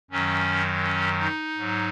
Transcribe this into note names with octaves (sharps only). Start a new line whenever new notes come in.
F#2 D#3 F#3 C#4
C#4
D#4
G#2 F#3